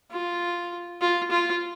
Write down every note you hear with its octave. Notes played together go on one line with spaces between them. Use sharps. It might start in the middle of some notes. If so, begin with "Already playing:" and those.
F4
F4
F4